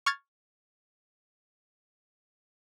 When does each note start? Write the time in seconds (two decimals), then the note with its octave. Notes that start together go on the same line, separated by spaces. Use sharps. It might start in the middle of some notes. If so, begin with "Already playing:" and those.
0.06 C#6 F6 G#6 A6